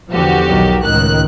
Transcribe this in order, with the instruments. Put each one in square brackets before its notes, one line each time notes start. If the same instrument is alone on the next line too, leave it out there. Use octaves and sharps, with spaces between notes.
[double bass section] E2 D3 F3 [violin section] F#4 G4
[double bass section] B1 D#3 F#3
[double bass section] C#2 A2 D#3 [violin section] F#6